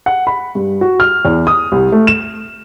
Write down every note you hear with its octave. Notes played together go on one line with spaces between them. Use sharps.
F#5
B5
G2
F#4
F6
E2
D#6
C2
A3
E7